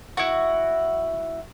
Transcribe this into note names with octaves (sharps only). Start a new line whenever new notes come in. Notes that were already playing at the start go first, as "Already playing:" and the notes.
E4 F#4